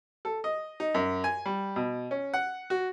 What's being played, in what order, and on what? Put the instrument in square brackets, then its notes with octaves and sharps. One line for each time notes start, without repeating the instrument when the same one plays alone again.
[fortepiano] A4
D#5
D#4
F#2
G#5
G3
B2
C#4
F#5
F#4